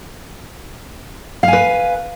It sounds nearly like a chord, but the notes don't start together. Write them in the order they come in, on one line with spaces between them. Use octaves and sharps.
F5 G#5 B4